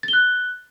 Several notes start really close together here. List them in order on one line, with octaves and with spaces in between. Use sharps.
A6 G7 F#6